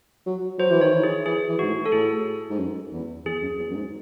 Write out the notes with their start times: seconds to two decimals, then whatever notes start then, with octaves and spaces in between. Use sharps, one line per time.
0.27 F#3
0.59 F#3 C5
0.71 E3
0.81 D#3 C#5
0.93 E3
1.03 G#4
1.26 E3 G#4
1.49 E3
1.59 G#2 F#4
1.70 A2
1.86 A4
1.92 A2 G#4
2.50 G#2
2.59 F#2
2.93 E2
3.25 E2 G#4
3.42 F#2
3.59 E2
3.70 F#2
3.76 G#2